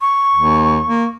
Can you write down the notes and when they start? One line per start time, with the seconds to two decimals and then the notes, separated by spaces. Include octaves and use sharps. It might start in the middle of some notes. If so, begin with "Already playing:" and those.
0.01 C#6
0.35 D#2
0.86 A#3